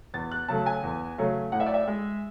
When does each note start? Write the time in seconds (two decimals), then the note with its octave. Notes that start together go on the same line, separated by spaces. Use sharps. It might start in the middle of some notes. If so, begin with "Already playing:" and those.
0.14 E2 A6
0.32 F#6
0.48 C#3 F#3 A3 A5
0.66 G#5
0.83 E2
1.18 C#3 F#3 A3
1.52 A2 F#5
1.60 E5
1.66 D5
1.74 E5
1.87 G#3